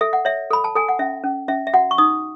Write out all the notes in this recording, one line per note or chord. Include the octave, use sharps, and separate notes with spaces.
A4 E5
F#5
C#5 E5
A4 B5
A5
A4 G#5
F#5
C#4 E5
C#4
C#4 E5
E5
F#4 F#5
C#6
D#4 D#6